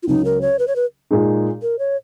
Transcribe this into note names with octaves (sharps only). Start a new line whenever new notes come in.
F4
C#2 C#3 F#3 C#4 D#4
A#4
C#5
B4
C#5
B4
A#2 G#3 D#4 G#4
A#4
C#5